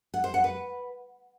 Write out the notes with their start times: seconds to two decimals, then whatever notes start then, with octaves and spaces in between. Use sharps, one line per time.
0.14 F#5
0.24 C5
0.34 F#5
0.44 B4